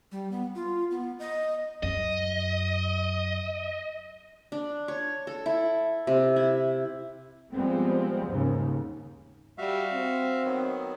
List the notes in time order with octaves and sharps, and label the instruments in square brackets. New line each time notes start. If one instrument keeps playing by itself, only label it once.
[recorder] G3
B3
F4
B3
D#5
[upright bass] F#2 [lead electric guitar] D#5
[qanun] D4
C#5
A4
E4
C3
E4
[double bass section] F3 G3 G#3 B3 C4
D#2 G#2 C#3
[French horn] G3 [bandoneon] F#4 E5 F5
[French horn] C4
[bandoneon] D#3 F#3 B3